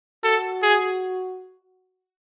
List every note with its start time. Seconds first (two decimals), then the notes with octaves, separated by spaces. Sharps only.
0.24 F#4 A4
0.63 G#4